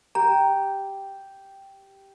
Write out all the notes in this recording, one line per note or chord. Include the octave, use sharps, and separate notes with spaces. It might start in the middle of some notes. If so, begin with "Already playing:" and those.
G4 A#5